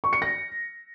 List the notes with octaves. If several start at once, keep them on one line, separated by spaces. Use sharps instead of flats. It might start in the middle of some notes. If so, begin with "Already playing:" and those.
C#6
C#7
A#6